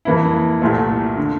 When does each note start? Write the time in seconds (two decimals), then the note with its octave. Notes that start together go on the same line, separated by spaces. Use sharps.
0.05 F2 E3 A#3 E4
0.62 C2 A#2 A3
1.17 D3